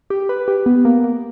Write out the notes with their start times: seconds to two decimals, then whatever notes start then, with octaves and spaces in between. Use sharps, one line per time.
0.10 G4
0.29 B4
0.48 G4
0.66 B3
0.85 A#3
1.04 A#3